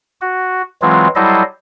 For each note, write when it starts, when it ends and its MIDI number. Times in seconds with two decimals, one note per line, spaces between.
0.21 0.62 66
0.82 1.08 52
0.82 1.08 54
0.82 1.08 56
0.82 1.08 60
0.82 1.08 65
1.15 1.43 54
1.15 1.43 55
1.15 1.43 64
1.15 1.43 69
1.15 1.43 72
1.15 1.43 75